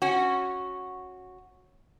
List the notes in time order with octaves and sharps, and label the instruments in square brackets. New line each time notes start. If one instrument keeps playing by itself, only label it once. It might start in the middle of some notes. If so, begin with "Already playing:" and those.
[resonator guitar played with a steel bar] C#4 F#4